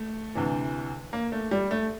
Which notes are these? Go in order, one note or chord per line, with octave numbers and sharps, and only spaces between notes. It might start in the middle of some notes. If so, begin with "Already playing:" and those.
Already playing: A3
D2 C3 E3
A#3
A3
G3
A3